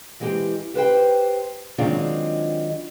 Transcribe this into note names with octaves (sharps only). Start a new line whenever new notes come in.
E3 G#3 C4 G4
G4 B4 C5 G5
D#3 F#3 G#3 C4 D4 F4